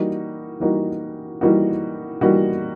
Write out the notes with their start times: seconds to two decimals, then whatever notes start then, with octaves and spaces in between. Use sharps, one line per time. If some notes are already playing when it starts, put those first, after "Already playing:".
Already playing: E3 G3 A#3 D#4 F#4
0.60 E3 G3 A#3 D#4 F#4
1.41 E3 G3 A#3 D#4 F#4
2.21 E3 G3 A#3 D#4 F#4